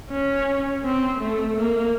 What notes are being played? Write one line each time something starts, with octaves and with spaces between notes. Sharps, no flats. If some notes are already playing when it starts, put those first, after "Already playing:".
C#4
C4
A3
A#3